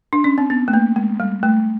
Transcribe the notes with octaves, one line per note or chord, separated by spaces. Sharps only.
D4
C#4
C4
B3
A3
A#3
G#3
G3
A3